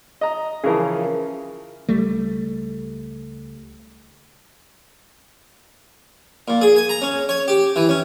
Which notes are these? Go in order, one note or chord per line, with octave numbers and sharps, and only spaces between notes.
D#5 A#5
C#3 E3 F3 G#4 A#4
C#2 G3 A3
A#2
G#4
G#5
A#5
C#4
C#5
G4
E3
C#4